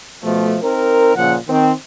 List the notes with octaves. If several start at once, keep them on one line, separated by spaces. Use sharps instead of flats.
B2 F3 A3
C4 D#4 A#4
A#2 C#3 F3 A#3 F#5
D#3 C4